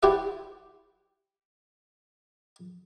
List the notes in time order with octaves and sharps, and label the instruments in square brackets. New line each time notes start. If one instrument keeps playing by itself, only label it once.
[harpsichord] E4 F#4 G4 C5 D5 E5